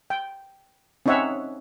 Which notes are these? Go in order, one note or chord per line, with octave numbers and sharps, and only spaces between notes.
G5
C4 C#4 D#4 C#5 E5 F#5